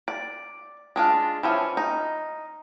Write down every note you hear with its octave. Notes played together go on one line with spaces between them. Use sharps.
D5
G#3 D4 F4
E3 F3 C#4
D#4